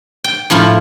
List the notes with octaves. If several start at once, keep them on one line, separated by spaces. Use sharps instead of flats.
G5
A2 F3 E4 F4